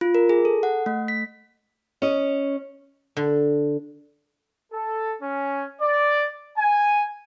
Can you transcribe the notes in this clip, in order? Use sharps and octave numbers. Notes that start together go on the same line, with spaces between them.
F4
A#4
G#4
A4
F#5
A3
B6
C#4 D#5
D3
A4
C#4
D5
G#5